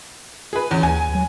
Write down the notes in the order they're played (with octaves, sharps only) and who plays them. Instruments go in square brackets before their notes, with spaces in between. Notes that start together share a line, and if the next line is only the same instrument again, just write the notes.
[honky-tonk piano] G#4 B4
E2 C#4
[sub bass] D#2 [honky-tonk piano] G#5
[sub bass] F#3